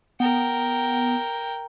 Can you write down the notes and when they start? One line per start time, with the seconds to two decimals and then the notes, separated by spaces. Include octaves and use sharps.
0.20 B3 A#4 G5